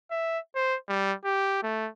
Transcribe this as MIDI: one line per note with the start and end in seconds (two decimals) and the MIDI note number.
0.11 0.39 76
0.56 0.76 72
0.88 1.13 55
1.25 1.62 67
1.63 1.88 57